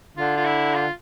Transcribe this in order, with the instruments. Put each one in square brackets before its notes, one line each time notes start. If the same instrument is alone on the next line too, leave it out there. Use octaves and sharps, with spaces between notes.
[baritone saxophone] D3 [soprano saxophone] F4
[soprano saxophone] F4
E4
F4